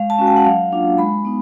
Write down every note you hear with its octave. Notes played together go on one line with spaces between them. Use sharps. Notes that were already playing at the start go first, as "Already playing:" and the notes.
Already playing: G#3 F5
A5
C#4 F#4 G#5
G5
F#5
F#3 F5
A#3 D4 F4
G#3 B5
B3 D#4